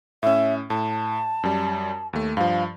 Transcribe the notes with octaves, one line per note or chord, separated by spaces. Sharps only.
A2 C#4 E5
A2 A5
F#2 G3
D#2 A3
G2 F3 F5